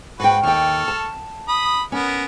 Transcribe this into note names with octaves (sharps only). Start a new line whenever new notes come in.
G#2 F#4 B4 G5
D#2 A4 G5 C#6 F6
A5
B5 D#6
B3 C#4 A#4